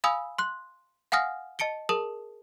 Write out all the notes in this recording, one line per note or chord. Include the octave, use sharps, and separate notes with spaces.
F5 G#5 B5 D#6 E6
C6 F#6
F5 F#5 G#5 D#6 F6 A#6
D#5 A5 C#7 D7 G7
G#4 A#4 A5 D#6